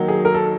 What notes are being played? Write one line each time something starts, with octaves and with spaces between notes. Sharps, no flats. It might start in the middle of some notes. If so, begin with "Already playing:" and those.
Already playing: D#3 F#3 A#3 D#4
G#4
A#4
A4